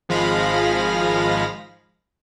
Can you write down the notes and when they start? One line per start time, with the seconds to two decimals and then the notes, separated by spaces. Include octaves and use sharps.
0.09 G#1 F3 G#3 F5 B5 A#6